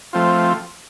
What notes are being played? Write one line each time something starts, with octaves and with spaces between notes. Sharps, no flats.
F3 A3 C4 F4